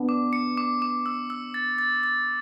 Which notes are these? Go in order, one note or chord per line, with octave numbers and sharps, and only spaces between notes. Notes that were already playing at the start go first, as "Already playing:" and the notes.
Already playing: B3 D4
D6
C#7
D6
D6
E6
E6
A6
A6
A6